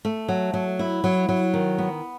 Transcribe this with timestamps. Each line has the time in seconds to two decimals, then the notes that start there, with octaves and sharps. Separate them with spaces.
0.05 A3
0.28 F#3
0.54 F#3
0.79 E4
1.04 F#3
1.29 F#3
1.54 D#3
1.78 B3